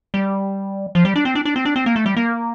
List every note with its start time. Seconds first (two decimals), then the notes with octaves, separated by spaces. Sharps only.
0.14 G3
0.95 F3
1.05 G3
1.16 D4
1.25 C4
1.35 D4
1.45 D4
1.56 C4
1.65 D4
1.76 C4
1.86 A#3
1.96 A3
2.06 G3
2.17 A#3